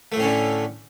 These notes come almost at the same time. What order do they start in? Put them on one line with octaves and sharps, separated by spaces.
A3 A2 C#4 D3